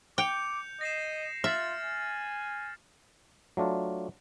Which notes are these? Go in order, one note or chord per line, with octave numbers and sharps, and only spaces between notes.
G5 D6 G6 C#7 F7
D#5 A#6 C7 E7
F4 E5 F6 A6 F#7
G#5
F#3 A3 D4 F4